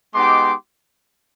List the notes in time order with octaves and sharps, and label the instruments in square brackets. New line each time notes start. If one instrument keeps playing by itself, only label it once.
[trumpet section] G#3 B3 D#4 G4 C6 D6